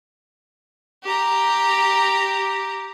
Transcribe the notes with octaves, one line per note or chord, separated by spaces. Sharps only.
G4 A#5